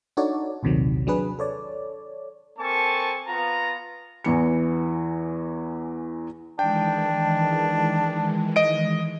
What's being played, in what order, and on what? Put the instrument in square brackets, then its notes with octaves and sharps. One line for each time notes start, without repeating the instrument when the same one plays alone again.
[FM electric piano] D4 D#4 F#4 A4 C#5 D5
A#1 D#2 C3 D#3 F#3
F#3 D4 G#4 B4
A4 C#5 D5
[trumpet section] A#3 C4 A4 G#5 A5 C#6
B3 F4 A#5
[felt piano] E2 E3 C#7
[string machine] D#3 E3 G#3 [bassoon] D4 [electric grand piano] G5
[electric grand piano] D#5 D7